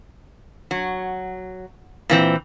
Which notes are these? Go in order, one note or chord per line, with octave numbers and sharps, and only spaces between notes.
F#3
A#2 E3 C4